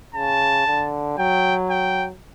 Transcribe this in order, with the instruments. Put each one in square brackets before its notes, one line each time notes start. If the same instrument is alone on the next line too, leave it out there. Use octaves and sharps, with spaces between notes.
[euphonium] C#3 [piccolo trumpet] A5
[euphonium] D3
[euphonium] F#3 [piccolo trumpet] G5
[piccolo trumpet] G5